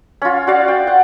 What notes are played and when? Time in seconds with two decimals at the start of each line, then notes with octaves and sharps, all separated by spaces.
0.22 C#4 F4
0.47 F#4 D5 F5
0.68 G5
0.87 F#5